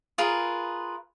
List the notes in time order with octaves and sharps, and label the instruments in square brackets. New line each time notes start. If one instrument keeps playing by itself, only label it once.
[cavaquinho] F4 G#4 A#4 B4